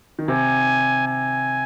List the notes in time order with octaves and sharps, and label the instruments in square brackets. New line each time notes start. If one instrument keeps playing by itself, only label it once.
[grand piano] D#3
[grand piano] C3 [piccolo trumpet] G#5
[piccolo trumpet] G#5